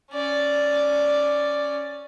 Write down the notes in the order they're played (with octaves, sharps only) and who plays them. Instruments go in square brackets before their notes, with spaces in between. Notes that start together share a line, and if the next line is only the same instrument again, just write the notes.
[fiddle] C#4 D5